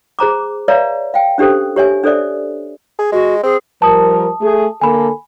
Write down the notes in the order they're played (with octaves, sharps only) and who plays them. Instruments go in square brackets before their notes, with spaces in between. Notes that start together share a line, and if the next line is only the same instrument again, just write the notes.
[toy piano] G#4 C5 A#5 D6
B4 C#5 D5 E5 F5 A#5
F5 G5
C#4 D4 G4 A4 C5
G4 C#5 E5 G#5
D4 A4 C5 D5 E5
[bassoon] G#4
[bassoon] G#3 [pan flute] F#4
[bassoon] C4 [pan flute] G#4
[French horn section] F3 G3 A#4 [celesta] A5 D#6
[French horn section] A3 G#4
[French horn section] D3 A#3 A4 [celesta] G#5 B5